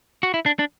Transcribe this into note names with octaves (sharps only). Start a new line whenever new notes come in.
F#4
E4
D4
D4